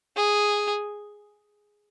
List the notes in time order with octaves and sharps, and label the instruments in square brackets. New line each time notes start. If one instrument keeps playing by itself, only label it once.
[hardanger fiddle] G#4